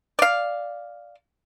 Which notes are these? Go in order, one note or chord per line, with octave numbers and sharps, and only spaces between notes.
D5 F5